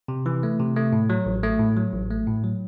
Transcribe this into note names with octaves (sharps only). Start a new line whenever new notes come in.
C3
E3
A3
C3
A3
A2
F#3
A1
A3
A2
F#3
A1
A3
A2
F#3